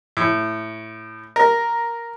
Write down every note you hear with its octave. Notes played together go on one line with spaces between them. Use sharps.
A2
A#4